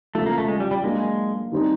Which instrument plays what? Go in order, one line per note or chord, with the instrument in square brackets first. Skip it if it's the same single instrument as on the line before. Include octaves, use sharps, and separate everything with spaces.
[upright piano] E2 C#3 F3 [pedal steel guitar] A3
[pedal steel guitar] A#3
A3
G#3
G3
G3
[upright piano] F#3 A#3 D4 [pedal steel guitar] G#3
[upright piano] D#3 G3 C4 D#4